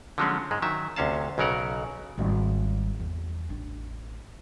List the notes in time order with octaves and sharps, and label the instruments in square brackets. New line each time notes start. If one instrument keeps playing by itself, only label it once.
[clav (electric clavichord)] D3 F3 F#3 G#3 C4 C#4
G#2 G#3
D#3 F#3 E5
D2 C3 C#4 F5 A5
B1 C#3 F#3 A#4 F#5
[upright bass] G#1 G3
E2
A1 D4